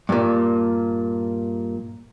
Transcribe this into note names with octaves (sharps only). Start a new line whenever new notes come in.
G2 A#2